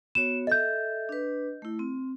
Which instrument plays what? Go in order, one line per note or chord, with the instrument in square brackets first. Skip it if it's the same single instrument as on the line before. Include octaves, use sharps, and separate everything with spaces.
[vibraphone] B3 F#4 C#5 [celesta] E7
[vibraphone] A4 E5 [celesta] D#5 G6
[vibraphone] D4 B4
A3 E4
C4